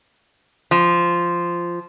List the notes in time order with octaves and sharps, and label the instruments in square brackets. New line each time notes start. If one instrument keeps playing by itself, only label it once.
[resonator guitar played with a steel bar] F3